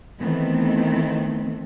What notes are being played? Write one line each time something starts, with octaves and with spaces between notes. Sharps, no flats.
D#3 E3 A3 B3 C4